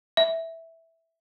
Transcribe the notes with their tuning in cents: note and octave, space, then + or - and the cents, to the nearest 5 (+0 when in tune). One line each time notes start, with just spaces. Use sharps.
E5 -5